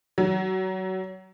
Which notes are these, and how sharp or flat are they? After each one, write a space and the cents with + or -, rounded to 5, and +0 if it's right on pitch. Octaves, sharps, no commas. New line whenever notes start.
F#3 +25